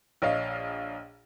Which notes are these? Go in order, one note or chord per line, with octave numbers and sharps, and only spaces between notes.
A#1 C#5 D#5 F5